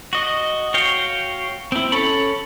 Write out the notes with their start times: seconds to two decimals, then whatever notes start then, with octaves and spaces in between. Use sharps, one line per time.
0.13 F#4 D#5
0.74 F#4 C#5 F5 G5
1.72 C4 E4
1.92 C#4 A4 C#5 B5